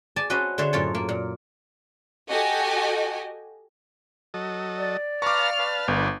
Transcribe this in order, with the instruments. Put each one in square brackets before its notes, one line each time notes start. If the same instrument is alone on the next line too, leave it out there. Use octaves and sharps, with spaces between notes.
[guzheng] D5 G#5 A5
C#4 F#4 B4 C5 D#5
D3 C5 C#5 E5
F#2 A2 F4 A4 C#5
A#3
A#2
[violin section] F#4 G4 A4 D#5 G#5
[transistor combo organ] F#3 A4 D#5
[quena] D5
[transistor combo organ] B4 A5 A#5 [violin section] F5 F6 [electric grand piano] C#6 D6
[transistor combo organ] B4 A5
[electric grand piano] G1 [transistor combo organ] B3 D4 [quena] A#4